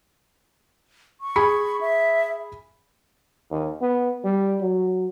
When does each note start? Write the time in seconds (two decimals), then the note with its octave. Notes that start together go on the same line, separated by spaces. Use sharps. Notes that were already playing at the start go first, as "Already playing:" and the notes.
1.21 C#6
1.36 G#4 B5 C#7
1.81 E5
3.51 D#2
3.82 B3
4.24 G3
4.61 F#3